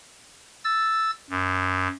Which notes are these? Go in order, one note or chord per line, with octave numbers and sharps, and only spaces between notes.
E6 A6
F#2